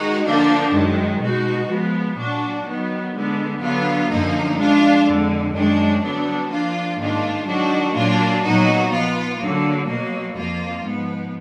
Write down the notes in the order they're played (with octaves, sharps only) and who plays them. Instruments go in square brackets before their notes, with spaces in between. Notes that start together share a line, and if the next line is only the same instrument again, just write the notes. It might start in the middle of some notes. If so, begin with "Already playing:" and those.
Already playing: [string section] D#3 G#3 D#4 F#4
D3 F3 A#3 D4
F#2 D#3 G#3
B2 G#3 D#4 F#4
F3 G#3 B3
A#2 F#3 D4 F#4
D#3 F#3 B3
D3 G#3 B3
D3 F#3 B3 F4
F#2 D3 F3 A#3 D#4
F3 G#3 D4 F4
F2 D3 G#3
F#2 D#3 G#3 D4
D3 F#3 B3 D4
F3 A#3 D4 F4
G#2 D#3 A#3 D4 F4
D#3 F#3 D4 F#4
A#2 F#3 A#3 D4 F4
A#2 F#3 B3 D#4 F#4
F3 B3 F4
D3 F#3 A#3
B2 F#3 A#3
F2 F3 A#3 F4
G#2 F3 B3